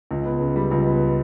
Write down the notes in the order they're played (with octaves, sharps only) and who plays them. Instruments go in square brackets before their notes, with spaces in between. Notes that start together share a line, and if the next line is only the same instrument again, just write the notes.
[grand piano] C#2
B3
C#3
G3
C#2
B3